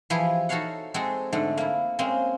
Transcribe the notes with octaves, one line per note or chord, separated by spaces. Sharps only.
E3 F3 E4 G4 G#4
D#4 F#4 A4 C#5 F5 F#5
G#3 C4 F#4 G#4 A4
G#2 D3 A3
A#3 E4
G#3 A#3 C4 C#4